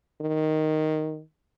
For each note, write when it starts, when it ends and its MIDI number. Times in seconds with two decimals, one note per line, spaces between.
0.21 1.21 51